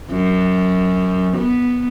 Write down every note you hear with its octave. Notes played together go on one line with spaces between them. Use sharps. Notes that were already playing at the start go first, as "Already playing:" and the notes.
F#2
B3